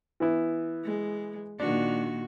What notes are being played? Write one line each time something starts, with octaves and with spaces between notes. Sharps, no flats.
E3 B3 E4
G#3
A#2 D#3 D4 F#4